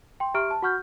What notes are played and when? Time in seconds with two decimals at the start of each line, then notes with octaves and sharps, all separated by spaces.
0.20 G5 C6
0.34 G4 E5 A#5 C#6 F6 D7
0.51 A5
0.62 F#4 F#5 C#6 F6 G6